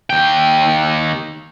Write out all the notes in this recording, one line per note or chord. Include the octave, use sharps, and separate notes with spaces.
D#2 G5